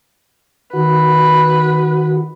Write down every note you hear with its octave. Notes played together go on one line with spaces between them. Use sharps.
D#3 F#4 B4